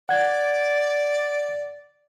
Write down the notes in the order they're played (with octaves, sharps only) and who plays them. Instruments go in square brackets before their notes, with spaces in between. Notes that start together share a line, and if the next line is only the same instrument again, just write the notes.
[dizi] D5 [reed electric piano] F#5 G#6